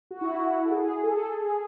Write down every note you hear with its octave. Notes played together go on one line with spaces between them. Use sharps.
F#4
E4
F#4
A4
G#4
A4
G#4